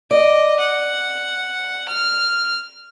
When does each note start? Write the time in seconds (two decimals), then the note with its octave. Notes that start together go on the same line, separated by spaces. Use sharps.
0.11 D5 D#5
0.60 F#5
1.88 F6